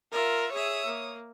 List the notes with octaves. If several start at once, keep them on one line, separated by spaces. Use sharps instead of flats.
F4 A#4 E5
G#4 C#5 E5 D#6
A#3